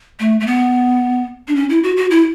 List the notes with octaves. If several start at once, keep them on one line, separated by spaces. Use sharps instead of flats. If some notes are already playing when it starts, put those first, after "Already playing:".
A3
A3
B3
D4
C#4
E4
F#4
F#4
E4